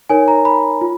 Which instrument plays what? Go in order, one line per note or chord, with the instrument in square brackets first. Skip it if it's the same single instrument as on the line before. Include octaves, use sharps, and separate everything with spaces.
[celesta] D#4 A#4 C#5 G#5
A#5
B5
F4